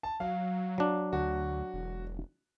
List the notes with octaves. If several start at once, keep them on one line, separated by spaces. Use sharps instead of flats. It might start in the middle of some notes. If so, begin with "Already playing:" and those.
A5
F#3 F5
F#3 D4
D2 F#4
E1